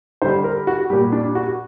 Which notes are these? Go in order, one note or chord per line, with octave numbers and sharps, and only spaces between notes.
D3 G3 C5
A#4
F#4
A#2 G3 G4
D4
F#4